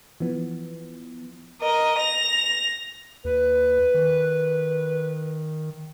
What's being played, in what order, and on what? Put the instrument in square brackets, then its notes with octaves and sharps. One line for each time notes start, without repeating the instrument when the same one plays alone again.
[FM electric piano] E3 F3 B3
[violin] A#4 D#5
A#6 F7
[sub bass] D#2 [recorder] B4
[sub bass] D#3